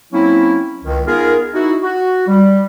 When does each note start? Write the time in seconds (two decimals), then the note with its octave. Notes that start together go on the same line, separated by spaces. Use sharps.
0.13 F#3 A#3 C4 C#4 E4
0.85 C#2 D#3
1.06 B3 D#4 F4 G#4 A#4
1.54 D#4 E4 F#4
1.83 F#4
2.28 G3